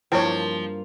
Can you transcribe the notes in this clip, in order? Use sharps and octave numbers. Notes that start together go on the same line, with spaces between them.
G2 F3 A#3 D4 E4 B4 C#5 G5